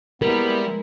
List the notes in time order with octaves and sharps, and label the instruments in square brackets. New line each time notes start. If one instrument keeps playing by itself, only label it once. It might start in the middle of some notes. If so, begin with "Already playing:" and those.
[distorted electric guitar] G3 [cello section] G#3 E4 [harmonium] B3 [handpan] A#4